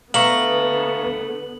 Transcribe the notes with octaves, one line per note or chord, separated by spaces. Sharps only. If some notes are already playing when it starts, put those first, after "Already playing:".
D3 A3 B3 F5 A#5 C#6 F#7